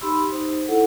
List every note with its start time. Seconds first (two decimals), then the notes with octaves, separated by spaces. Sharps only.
0.01 D#4 G4 B5 C6 E6
0.29 D#4 C5
0.68 E4 A4 F#5